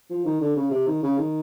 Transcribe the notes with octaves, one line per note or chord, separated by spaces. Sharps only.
F3
D#3
D3
C#3
C3
D#3
C#3
D#3